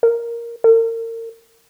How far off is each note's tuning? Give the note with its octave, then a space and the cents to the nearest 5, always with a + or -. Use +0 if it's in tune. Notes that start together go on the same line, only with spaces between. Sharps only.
A#4 +5
A#4 -35